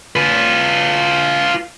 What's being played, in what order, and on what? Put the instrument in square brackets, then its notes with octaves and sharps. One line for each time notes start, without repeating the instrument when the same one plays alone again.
[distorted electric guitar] F4 B4